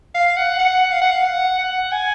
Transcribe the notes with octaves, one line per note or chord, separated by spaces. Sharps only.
F5
F#5
F#5
F5
F#5
F5
F#5
F#5
G#5